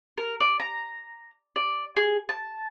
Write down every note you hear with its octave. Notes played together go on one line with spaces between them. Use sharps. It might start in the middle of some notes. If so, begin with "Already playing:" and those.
A#4
D5
A#5
D5
G#4
A5